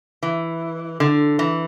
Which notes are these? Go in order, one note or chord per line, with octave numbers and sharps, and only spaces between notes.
E3
D3
E3